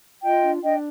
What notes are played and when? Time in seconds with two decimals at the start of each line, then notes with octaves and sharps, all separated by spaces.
0.23 F4 D#5 G5
0.43 D4
0.63 D4 D#5 G5